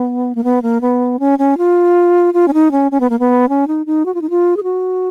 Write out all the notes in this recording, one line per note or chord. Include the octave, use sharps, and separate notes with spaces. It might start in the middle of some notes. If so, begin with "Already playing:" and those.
Already playing: B3
A#3
B3
A#3
B3
C#4
C#4
F4
F4
C#4
D#4
C#4
C#4
B3
A#3
B3
C#4
D#4
D#4
F#4
F4
D#4
F4
G#4
F#4